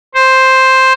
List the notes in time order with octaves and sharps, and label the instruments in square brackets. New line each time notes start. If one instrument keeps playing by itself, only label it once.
[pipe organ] C5